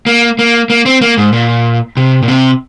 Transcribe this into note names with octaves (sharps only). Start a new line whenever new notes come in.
A#3
A#3
A#3
C4
A#3
G#2
A#2
C3
A#2
C3